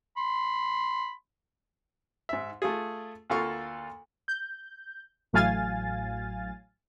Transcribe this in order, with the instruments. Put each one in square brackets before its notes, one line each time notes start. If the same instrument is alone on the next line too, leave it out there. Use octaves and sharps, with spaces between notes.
[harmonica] B5 C6
[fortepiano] G#2 E5
A3 F4 G#4
D2 A#3 F4 A4 F5 C#6
[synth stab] G6
A1 A2 F#3 F5 G#5 A6